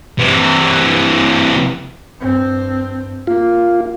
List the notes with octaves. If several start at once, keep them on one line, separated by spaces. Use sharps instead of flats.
C3 E3
G2 C4
A#3 F4